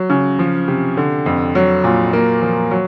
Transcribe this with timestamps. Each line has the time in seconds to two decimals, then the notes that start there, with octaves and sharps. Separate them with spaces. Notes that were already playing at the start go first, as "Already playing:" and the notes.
Already playing: F#3
0.10 C#3
0.39 F3
0.68 C3
0.97 D3
1.26 F2
1.55 F#3
1.84 A#2
2.13 A#3
2.42 F3
2.71 F#3